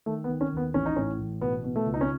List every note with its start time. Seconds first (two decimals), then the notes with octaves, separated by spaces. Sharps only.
0.06 D#3 A3
0.24 B3
0.29 D#3
0.41 C#4
0.52 D#2 B3
0.74 A1 C#4
0.86 D#4
0.96 A2 C#4
1.19 A1
1.41 B2 B3
1.64 B2
1.76 A3
1.86 C#2
1.94 D#4
2.01 C#4